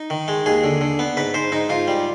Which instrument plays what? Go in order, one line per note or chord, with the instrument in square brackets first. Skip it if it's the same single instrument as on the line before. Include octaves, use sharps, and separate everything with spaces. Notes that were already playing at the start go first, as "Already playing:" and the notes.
Already playing: [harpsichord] D#4
D#3
G#3
D#2 G#4
D3
D3
B3
G#2 B4
G#2 C5
G#2 D#4
G#2 F4
G3